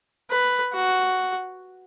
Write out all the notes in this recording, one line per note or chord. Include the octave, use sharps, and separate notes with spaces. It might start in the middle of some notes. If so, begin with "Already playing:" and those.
B4
F#4